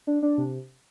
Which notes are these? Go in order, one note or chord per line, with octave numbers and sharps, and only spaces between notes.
D4
D4
C3